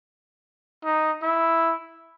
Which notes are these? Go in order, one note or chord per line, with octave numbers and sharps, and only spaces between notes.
D#4
E4